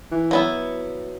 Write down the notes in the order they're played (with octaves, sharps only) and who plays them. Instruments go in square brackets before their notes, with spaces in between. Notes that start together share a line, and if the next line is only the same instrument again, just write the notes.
[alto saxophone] E3
[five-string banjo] F#3 B3 E4